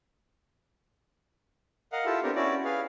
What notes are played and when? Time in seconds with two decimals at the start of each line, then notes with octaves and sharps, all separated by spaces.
1.92 A#4 D#5 F5 F#5
2.05 E4 F4 G4 A4 E5
2.23 B3 C4 D4 G4 A#4
2.35 C#4 E4 F#4 D5
2.65 G#4 B4 F5